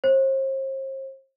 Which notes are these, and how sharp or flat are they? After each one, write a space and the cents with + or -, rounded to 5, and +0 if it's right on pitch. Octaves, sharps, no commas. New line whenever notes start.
C5 +40